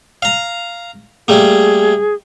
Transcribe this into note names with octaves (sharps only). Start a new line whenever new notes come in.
F5 A#5
G3 A3 A#3 G#4